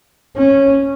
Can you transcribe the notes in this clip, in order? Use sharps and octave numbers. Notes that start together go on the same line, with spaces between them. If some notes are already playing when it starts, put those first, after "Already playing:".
C#4